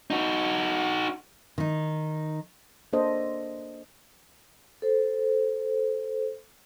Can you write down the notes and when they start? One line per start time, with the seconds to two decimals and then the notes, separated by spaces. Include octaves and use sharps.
0.10 D#4 F#4
1.58 D#3 D#4
2.93 A#3 D4 A4 C5 D#5
4.82 A4 C5